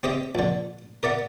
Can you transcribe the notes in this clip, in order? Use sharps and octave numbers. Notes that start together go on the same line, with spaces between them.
C4 G4 D#5 E5
A#1 D3
A#4 D5 E5 F#5